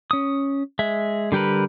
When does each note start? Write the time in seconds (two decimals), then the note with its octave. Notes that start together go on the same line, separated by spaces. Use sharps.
0.11 C#4 D#6
0.79 G#3 E5
1.32 D3 G3 G4 A#4 B4